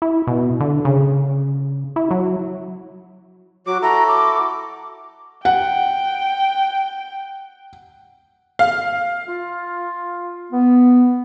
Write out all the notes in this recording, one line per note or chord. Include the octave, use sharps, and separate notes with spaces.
E4
B2
D3
C#3
E4
F#3
F#3 F#4 D6
E4 F#4 A4 A#5
D6
F#5 G5
F5
F4
B3